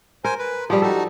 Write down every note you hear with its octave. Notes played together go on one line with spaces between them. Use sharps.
A#4 C5 G#5
B4
F3 G3 G4 G#4
D#4 F#4 A4